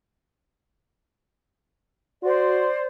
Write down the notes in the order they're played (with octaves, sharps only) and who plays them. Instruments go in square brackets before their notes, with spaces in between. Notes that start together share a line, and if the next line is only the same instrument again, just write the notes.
[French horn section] F#4 [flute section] C5 D5 C6